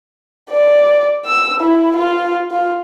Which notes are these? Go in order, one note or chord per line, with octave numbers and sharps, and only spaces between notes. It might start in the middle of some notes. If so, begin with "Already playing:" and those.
D5
E6
E4
F4
F4